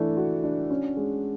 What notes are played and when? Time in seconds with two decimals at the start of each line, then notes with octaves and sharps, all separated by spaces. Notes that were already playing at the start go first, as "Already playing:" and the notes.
Already playing: E3 A3 D4
0.17 F#4
0.44 D4
0.70 C#4
0.97 G#3